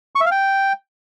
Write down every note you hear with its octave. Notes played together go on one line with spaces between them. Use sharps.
C#6
E5
F5
G5